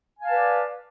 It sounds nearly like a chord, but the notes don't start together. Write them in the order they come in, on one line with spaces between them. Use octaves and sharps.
G#5 F5 A5 B4 D5